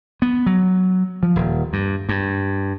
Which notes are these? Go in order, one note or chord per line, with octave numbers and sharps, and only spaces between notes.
B3
F#3
F3
D#1
G2
G2